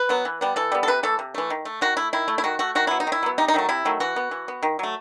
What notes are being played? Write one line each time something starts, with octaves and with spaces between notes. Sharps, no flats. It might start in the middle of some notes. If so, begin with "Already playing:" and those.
Already playing: B4
F#3 B3
E3
G3 B3
E3 A4
G3 B3
A4
C3 B4
E3 A3 A4
C3
E3 A3
D#3
A3
D#3 F#4
A3 E4
D#3 E4
A3
E4
D#3 F#4
A3 F#4
D#3 F#4
F#3 B3 E4
D#4
D#3
E4
F#3 B3
C3 D#4
D#4
D#3 F#3 A3
C3 E4
D#3 F#3 A3
E3 F#4
B3
E3
B3
D#3
F#3 A3